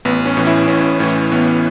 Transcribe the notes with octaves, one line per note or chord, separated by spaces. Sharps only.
A1 B3
C#4
A2 E3
E4
A1 C#4
A2 E3 C#4
A1 B3